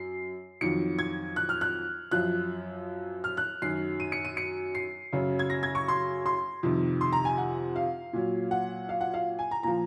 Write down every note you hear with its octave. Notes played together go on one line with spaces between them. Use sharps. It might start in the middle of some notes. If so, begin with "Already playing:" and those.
Already playing: F#2 C7
F2 D#3 F#3 C#7
G#6
F#6
F6
F#6
F#2 F3 F#6
F6
F#6
F#2 D#3 F#3 C7
D#7
C#7
D#7
C#7
C7
F#2 C#3 F#3
G#6
A#6
G#6
C#6
C6
C6
F2 C3 D#3
C6
A#5
G#5
F#5
F5
A#2 F#3
F#5
F5
F#5
F5
G#5
A#5
A#2 F3 A#5